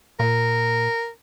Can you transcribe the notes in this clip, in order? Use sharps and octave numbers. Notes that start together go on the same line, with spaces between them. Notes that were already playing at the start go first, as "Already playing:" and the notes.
A#2 A#4